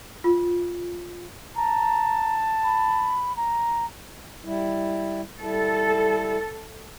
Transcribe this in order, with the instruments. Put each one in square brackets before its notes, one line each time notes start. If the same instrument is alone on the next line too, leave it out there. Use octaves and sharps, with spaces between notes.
[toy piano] F4
[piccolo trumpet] A5 [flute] A#5
[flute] B5
A#5
[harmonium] G3 E4
[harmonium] G3 E4 [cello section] A4